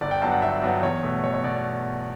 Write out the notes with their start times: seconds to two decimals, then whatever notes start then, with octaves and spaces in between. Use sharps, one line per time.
0.01 G1 D5
0.11 G5
0.22 G2 F#3 B3 A5
0.31 F#5
0.42 G1 E5
0.62 G2 F#3 B3
0.83 E2 C#5
1.03 B2 A3
1.24 E2 C#5
1.34 C#5
1.44 B2 D5